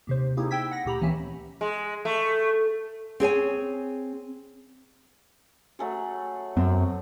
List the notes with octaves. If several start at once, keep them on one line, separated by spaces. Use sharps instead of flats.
D#2 C3 C5
A#3 C4 D#4 E4 G4 G#4
G5 E6 G#6 B6
F#5 A#6
D2 A#2 G4 A#5 B5
C#2 E3 A#3 C4 C#4 E5
G#3
A3
C4 G#4 C#5 G#5
F#3 A3 G#4
F#2 C4